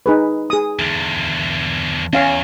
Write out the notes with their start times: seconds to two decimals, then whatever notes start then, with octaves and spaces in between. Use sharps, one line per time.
0.06 D#4 G#4 B4
0.50 G#4 D#6
0.79 E2 D3
2.13 E2 C#4 F5 G#5